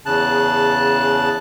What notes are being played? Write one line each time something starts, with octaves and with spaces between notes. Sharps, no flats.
E2 C#3 A5 F#6